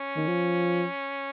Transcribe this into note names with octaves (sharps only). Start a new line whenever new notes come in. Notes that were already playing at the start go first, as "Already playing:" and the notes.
Already playing: C#4
D#3
F3